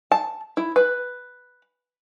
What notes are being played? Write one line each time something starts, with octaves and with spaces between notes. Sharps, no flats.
A5
E4
B4